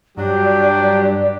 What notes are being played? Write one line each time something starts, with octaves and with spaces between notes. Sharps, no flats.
G2 F#3 D4 G4 D5